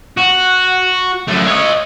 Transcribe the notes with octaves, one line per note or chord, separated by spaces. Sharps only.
F#4
F#2 A3
C#5 D#5